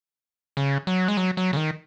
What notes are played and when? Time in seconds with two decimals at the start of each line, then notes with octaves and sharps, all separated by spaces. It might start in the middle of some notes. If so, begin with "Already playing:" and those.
0.57 C#3
0.87 F#3
1.08 G#3
1.17 F#3
1.37 F#3
1.53 C#3
1.57 D#3